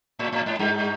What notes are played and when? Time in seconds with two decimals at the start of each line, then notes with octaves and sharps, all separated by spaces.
0.19 A2
0.32 A2
0.46 G#2
0.59 G2